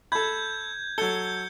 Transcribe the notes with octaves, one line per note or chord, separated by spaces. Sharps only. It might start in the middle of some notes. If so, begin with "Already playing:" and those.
A4 B5 G6 G#6
F#3 A4 G6 C#7 G7